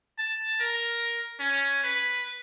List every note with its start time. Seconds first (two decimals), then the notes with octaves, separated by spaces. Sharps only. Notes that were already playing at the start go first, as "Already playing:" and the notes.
0.19 A5
0.60 A#4
1.40 C#4
1.84 B4